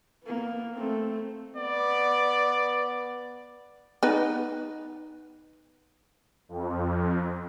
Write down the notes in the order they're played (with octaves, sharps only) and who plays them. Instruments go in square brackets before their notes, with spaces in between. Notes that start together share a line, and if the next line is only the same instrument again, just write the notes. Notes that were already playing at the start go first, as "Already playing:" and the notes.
[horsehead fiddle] A#3 B3
A3 C4
[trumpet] B3 [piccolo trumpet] D5
[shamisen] B3 D#4 B4
[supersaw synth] F2